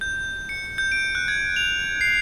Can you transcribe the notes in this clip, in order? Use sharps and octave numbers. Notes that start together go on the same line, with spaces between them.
G6
C#7
G6
D7
F#6
G#6
F7
C7